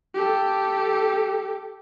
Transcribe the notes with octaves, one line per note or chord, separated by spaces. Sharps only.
G4 A4